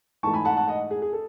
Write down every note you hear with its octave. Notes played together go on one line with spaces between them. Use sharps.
G#2 E3 A3 A5 C#6
G#5 B5
F#5 A5
F#5 A5
D#5 F#5
G#4
G#4
A4